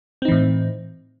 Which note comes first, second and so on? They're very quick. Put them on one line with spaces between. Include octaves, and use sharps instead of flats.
C4 D#4 E3 A2